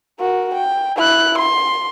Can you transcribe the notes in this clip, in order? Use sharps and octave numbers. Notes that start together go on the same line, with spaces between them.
F#4 A#4
G5
E4 F#6
C6